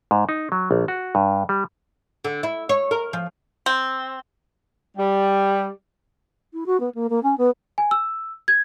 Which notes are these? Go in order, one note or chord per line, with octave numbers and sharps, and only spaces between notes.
G#2
D#4
F#3
A#1
F#4
G2
G3
D3
E4
C#5
A#4
F3
C4
G3
E4
F#4
B3
A#3
A#3
C#4
B3
G#5
E6
G#6